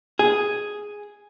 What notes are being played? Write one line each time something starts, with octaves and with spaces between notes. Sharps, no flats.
G#4